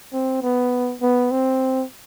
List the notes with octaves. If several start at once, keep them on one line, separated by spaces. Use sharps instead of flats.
C4
B3
B3
C4